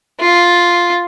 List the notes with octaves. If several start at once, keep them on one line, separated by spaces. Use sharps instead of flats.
F4